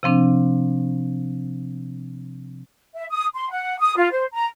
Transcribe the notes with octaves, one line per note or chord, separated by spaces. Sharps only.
C3 F3 C4 D4
E5
D#6
C6
F#5
D#6
F4
C5
A#5